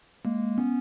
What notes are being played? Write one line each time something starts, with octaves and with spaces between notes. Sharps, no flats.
G#3 A#3
B3 C#4